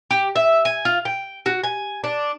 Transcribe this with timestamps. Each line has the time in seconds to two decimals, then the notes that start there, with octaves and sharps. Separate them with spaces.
0.11 G4
0.36 E5
0.65 G#5
0.85 F4
1.05 G5
1.46 F#4
1.64 G#5
2.04 D4